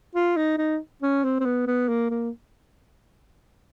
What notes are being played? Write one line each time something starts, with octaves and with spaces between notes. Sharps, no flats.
F4
D#4
D#4
C#4
C4
C4
B3
B3
A#3
A#3